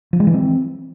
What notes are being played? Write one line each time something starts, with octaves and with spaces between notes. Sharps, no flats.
F3
G#3
E3
C4